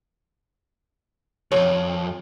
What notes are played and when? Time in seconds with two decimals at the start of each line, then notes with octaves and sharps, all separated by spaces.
1.52 B1 F2 C#5